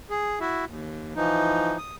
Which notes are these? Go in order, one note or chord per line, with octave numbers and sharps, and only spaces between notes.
G#4
E4 F#4 E5
D#2
E3 F3 D#4
D#6